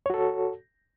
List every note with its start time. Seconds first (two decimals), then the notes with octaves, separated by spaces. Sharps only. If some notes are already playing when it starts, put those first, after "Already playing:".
0.06 C#5
0.10 F#4
0.14 A4